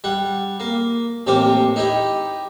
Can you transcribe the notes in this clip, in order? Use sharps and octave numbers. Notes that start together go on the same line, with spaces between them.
G3 F#5
A#3
A1 C3 A#3 G4 C5
D#4 E4 G4